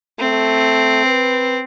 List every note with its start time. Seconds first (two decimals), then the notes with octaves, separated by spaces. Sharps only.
0.19 A3 C4
1.05 B4